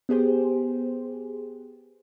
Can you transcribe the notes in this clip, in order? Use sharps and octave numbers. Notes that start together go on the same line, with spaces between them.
B3 G4 G#4 C5